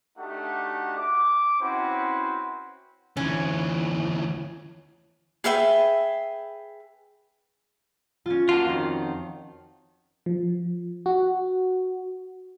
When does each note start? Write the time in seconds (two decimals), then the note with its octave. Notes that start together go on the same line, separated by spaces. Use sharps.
0.18 A3 D4 D#4 F#4 G4 F#5
0.97 D6
1.61 C4 C#4 E4 F#4 B4 C5
3.17 D2 E3 C#4
5.44 G#4 B4 E5 G5
8.26 C#4 F4
8.49 A#3 F4 F#4 A5
8.66 F2 D#3
10.26 F3
11.06 F#4